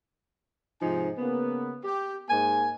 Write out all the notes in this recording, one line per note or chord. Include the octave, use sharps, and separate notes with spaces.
G#2 C3 F3 D#4 G#5
C#3 A#3 B3
G4
G#2 A#3 G#5